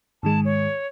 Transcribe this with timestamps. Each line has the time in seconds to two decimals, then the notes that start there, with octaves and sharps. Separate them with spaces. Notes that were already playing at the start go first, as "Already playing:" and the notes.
0.23 G#2 D#3 G#3 A5
0.45 C#5